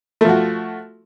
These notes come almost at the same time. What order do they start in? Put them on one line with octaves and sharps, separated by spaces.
A3 F3 F#4